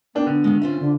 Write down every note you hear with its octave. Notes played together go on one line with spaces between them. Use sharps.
A#3 B3 D4 G5
D3
D#3 G#3
C#4 F4 C5 E5
D3